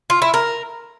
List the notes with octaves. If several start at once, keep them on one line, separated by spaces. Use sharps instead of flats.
F4
E4
A#4